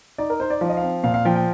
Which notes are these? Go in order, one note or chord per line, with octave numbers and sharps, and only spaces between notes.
D#4 D5
A#4
D#4 C5
D5
F3 F5
D#5
F5
C4
A#2 F5
F5
F3 G5
G5